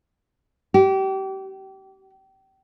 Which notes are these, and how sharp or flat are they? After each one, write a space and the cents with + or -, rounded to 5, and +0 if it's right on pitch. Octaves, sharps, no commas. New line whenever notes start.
G4 -30